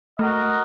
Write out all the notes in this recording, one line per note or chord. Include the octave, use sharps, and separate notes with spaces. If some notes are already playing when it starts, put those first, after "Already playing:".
A3 F#4 A#4 D#5